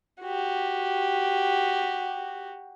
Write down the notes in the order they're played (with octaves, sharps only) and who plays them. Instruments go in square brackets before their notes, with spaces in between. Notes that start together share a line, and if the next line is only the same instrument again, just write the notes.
[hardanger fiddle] F#4 G4